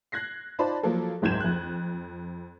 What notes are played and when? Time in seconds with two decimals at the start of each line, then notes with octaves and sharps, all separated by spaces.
0.12 F#6 G#6 A#6 C7
0.59 D#4 F4 C5 D5 A5 B5
0.83 F3 F#3 A#3 A4
1.22 F#1 C#2 G#2 G6 G#6 E7
1.40 F2 F#6